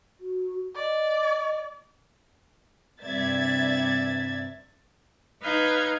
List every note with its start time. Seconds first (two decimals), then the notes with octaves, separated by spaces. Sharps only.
0.20 F#4
0.75 D5 D#5
3.02 G2 C3 D5 E5 G#6 A6
5.41 D#4 B4 F5 F6 G6 G#6